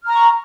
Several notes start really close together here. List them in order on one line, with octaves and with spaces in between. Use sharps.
F6 A#5 C#6